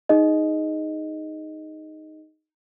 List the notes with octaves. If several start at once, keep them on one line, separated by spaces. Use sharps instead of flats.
D#4 G#4 D#5